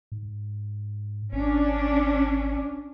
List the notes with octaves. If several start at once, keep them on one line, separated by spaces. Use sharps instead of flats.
G#2
G#1 C#4 D4